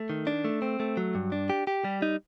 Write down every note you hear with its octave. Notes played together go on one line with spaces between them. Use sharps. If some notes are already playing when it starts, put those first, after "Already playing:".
Already playing: A3
D#3
D4
A3
C4
A3
F#3
G2
D4
G4
G4
G3
D#4